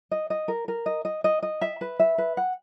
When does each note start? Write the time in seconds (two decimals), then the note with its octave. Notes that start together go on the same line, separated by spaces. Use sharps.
0.11 D#5
0.30 D#5
0.48 A#4
0.68 A#4
0.86 D#5
1.05 D#5
1.24 D#5
1.43 D#5
1.61 E5
1.81 B4
2.00 E5
2.18 B4
2.37 F#5